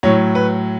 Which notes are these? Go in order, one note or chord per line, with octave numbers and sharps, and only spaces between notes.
A2 F#3 C#5
B4